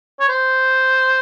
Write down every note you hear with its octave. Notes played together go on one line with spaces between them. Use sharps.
C#5
C5